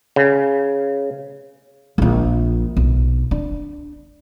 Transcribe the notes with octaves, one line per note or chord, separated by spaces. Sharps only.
C#3
A#1 F4
B1
D4